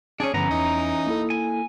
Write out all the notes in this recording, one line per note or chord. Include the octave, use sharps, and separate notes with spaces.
C#4 D4 G#4
G2 D3 E3 F3 B3 C#4 A#5
E2 D#4
A#3 E4 A4
G#5